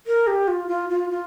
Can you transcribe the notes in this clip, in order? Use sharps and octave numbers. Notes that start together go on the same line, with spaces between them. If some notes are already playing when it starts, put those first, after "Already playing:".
A#4
G4
F4
F4
F4
F4